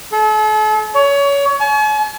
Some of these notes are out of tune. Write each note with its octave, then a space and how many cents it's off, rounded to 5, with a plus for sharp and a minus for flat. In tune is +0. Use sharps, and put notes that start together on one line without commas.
A4 -40
C#5 +25
G#5 +45